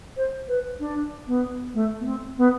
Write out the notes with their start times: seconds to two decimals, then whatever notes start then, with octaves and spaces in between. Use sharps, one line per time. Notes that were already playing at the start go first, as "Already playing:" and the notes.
0.17 C5
0.48 B4
0.80 D4
1.27 B3
1.74 A3
2.00 B3
2.05 C4
2.37 B3